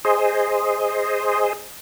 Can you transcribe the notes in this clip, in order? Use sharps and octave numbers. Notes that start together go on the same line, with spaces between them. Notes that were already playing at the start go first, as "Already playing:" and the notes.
G#4 C5 D#5